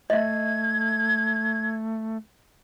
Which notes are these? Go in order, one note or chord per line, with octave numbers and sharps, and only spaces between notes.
A3 D#5 E5 G#6